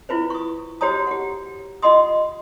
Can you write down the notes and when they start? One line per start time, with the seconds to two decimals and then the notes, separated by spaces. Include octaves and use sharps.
0.09 E4 F4 B4 C5
0.30 C#6 D#6
0.81 F#4 G4 C5 C#5 A#5 D#6
1.07 G4 F#5
1.82 F4 D#5 F#5 C6 D#6